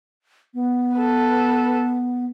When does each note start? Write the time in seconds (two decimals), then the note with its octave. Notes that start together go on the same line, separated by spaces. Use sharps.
0.54 B3
0.96 A4 B4